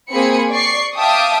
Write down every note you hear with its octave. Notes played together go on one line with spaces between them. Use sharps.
A#3 C4 G#4 G#5 B5 C#7
D5 C#6 C7
E5 F5 G5 A5 D6 D#6